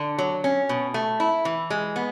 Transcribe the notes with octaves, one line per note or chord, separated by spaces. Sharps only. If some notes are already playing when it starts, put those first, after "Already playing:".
Already playing: D3
F#3
C#4
B2
A3
E4
E3
G#3
B3